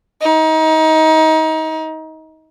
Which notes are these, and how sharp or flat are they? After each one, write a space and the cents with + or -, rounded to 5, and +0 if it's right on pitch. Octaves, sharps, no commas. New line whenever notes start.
D#4 +25